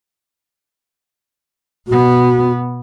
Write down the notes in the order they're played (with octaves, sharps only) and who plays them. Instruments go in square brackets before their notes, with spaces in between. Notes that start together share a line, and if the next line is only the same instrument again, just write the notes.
[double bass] B2 B3 [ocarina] F#4